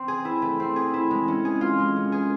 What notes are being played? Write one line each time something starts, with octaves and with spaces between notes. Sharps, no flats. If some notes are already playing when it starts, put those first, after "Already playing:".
Already playing: C4
G#4
E4
A3
C4
G#4
E4
G#3
C#4
G#4
F4
G#3
C#4
G#4